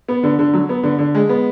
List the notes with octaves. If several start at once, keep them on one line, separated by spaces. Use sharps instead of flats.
B3
D3
D3
F#3
B3
D3
D3
G#3
B3